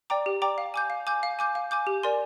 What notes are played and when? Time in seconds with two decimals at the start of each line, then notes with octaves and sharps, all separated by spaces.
0.10 D5 G5 A#5 D6
0.26 G4
0.42 D5 G5 A#5 D6
0.58 F5
0.74 G#5 D6 G6
0.90 F5
1.07 G#5 D6 G6
1.23 F5
1.39 G#5 D6 G6
1.55 F5
1.71 G#5 D6 G6
1.87 G4
2.03 A#4 D5 G#5 C6